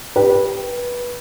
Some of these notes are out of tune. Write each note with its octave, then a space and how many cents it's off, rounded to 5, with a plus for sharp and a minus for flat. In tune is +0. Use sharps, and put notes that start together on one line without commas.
G4 +0 B4 -20